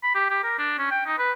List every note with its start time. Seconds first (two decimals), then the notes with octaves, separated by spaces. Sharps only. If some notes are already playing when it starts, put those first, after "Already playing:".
0.03 B5
0.14 G4
0.30 G4
0.44 A#4
0.58 D4
0.78 C#4
0.91 G5
1.06 D#4
1.19 B4